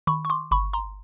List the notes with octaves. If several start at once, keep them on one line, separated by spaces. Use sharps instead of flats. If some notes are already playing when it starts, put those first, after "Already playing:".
D#3 B5 C#6
C#6
C6 D6
G1 B5 C#6
A#5 C6